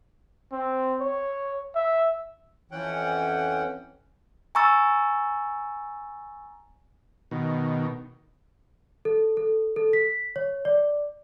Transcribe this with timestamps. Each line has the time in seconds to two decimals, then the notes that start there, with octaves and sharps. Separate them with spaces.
0.52 C4
1.01 C#5
1.75 E5
2.71 F2 E3 C#4 F#5 G5
4.55 G#5 A#5 C#6 E6 A6
7.31 B2 D#3
9.05 A4
9.37 A4
9.76 A4
9.93 B6
10.36 C#5
10.65 D5